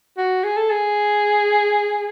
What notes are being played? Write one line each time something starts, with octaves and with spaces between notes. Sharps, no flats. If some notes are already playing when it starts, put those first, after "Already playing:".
F#4
G#4
A4
G#4